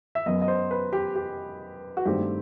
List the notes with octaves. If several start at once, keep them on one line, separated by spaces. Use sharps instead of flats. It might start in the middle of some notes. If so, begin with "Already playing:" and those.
E5
F#2 F#3 B3 D#5
D#5
C5
B4
G4
G4
F#4
G2 D#3 A3 C4 G4